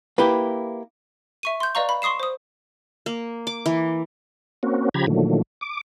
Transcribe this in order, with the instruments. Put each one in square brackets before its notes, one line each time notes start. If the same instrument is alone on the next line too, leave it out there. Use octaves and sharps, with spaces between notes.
[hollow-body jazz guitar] A#3 E4 G4 [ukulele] B4
[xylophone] E5 C#6 D#7
C6 G6
B4 D5 D#5 F5 A#5 C#6
B5
C6 C#6 D#6 C7 E7
C5 D#6
[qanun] A#3
D6
E3
[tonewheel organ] A#3 C4 C#4 F#4
C#3 F3 G4 A#5 B5 G#6
A#2 D3 D#3 F3 F#3 A3
D6